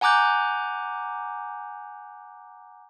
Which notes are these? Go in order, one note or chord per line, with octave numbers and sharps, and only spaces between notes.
F#5 G#5 A#5 D6 F#6 G6